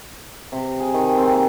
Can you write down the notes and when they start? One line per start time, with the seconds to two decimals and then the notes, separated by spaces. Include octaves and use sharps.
0.52 C3
0.80 G#4
0.94 D#3
1.18 C4
1.32 A#3